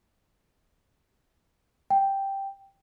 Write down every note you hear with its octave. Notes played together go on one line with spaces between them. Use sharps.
G5